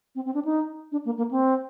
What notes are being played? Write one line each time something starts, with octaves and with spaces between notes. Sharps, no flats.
C4
C4
D4
D#4
D4
A#3
A#3
C4